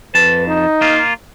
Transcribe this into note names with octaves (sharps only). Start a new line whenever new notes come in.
F2 B4 A5
D#4
A#3 F4